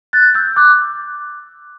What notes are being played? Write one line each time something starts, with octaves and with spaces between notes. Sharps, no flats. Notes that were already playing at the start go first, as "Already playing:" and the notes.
F#6 A6
E6 G6
D6 F#6